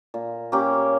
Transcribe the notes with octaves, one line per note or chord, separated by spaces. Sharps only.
A#2
A#3 C#4 G4